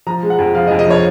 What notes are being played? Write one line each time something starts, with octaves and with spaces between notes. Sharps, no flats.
F3 A#5
G#3
F#5
F2
F3 F5
D#5
F2
D#5
F3 C#5